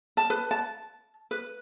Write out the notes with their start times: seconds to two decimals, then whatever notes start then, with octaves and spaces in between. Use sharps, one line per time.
0.17 A5
0.30 B4
0.51 A5
1.31 B4